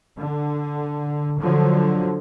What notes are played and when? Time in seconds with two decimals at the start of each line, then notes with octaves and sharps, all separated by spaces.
0.18 D3
1.40 D3 F3 F#3